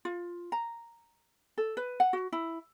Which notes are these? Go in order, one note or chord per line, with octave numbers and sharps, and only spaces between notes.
F4
A#5
A4
B4
F#5
F#4
E4